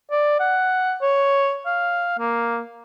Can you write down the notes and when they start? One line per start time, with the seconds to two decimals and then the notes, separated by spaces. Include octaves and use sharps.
0.11 D5
0.40 F#5
1.02 C#5
1.66 F5
2.19 A#3